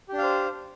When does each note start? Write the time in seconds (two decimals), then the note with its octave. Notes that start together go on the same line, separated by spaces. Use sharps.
0.08 G4
0.13 D4
0.18 F5
0.23 C5